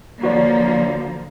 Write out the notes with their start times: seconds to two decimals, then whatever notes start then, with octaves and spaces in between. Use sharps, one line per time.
0.23 D3 F3 A#3 F#4 C#5 D5